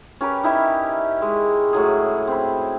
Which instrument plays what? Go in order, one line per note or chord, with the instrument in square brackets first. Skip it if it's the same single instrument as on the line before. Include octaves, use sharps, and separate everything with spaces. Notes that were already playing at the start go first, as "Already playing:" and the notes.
[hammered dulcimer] C#4 G4 A#4 B4
D#4 E4 G4 E5
G#3
A2 F#3 G#4
C4 B5